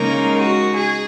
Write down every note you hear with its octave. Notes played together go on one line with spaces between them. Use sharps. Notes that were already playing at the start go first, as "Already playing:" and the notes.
Already playing: C#3 G#3 A#3 D#4 A#4
F#4
G#4